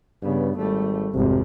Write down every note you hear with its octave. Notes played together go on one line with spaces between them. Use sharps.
G2 C#3 B3
G#1 G3 A3
G#1 F2 C3